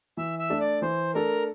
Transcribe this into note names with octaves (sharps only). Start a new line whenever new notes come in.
E3 E5
E5
A3 D4 A4
D5
E3 C5
A3 D4 A4 A#4